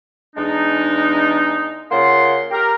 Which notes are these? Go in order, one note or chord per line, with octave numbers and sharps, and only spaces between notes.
E2 G#3 D4 D#4
C#3 A#3 F4 F#5 C6
G4 A#4